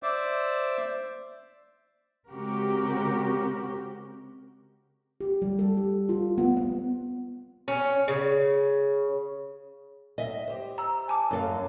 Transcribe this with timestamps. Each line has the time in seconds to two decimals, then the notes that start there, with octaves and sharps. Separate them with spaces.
0.03 C5 D5 E5 D6
2.29 C#3 G#3 C4 F#4 G4 A#4
5.21 G4
5.42 G3
5.59 A4
5.77 G4
6.09 F4
6.38 B3
6.57 B3
7.68 C#4
8.08 C#3
10.18 D#5 E5
10.47 G4 C5
10.78 A#5 E6
11.08 G#5 A5 D6
11.31 F#2 A4 F5